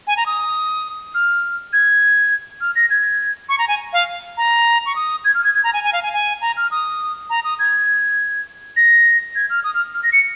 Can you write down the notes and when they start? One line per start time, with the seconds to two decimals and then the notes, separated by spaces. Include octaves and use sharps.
0.07 G#5
0.17 A#5
0.26 D#6
1.14 F6
1.73 G#6
2.61 F6
2.76 A#6
2.90 G#6
3.49 C#6
3.59 A#5
3.68 G#5
3.93 F5
4.37 A#5
4.86 C#6
4.96 D#6
5.25 G#6
5.35 F6
5.44 G#6
5.54 G#6
5.64 A#5
5.73 G#5
5.84 G#5
5.93 F5
6.03 G#5
6.13 G#5
6.41 A#5
6.57 F6
6.71 D#6
7.30 A#5
7.44 D#6
7.59 G#6
8.77 A#6
9.36 G#6
9.50 F6
9.64 D#6
9.74 F6
9.94 F6
10.03 A#6
10.13 C#7